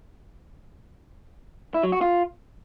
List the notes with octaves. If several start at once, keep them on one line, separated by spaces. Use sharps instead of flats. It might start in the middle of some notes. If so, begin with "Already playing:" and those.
E4
F#3
F#4
F4